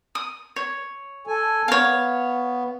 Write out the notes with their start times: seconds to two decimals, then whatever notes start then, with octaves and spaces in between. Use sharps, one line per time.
0.15 D#6
0.56 C#5
1.27 A4 G#5
1.68 B3 C#5 F5